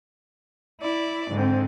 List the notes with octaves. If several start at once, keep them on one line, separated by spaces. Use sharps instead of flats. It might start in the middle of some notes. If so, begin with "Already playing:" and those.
E4 D5
G#2 D3 C4